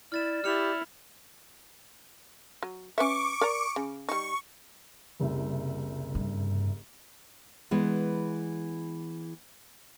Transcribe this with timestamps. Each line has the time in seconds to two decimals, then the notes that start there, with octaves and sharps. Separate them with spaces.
0.12 E4 D5 F6 A6 E7
0.44 E4 G4 F6 C#7 F7
2.63 F#3
2.98 C#4 B4 E5 C#6 D6
3.41 A#4 D5 A#5
3.76 C#3
4.09 G3 D#4 C#6
5.20 F#1 C2 E5
6.15 G2
7.71 E3 G#3 B3